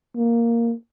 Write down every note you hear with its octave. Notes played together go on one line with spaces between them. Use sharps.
A#3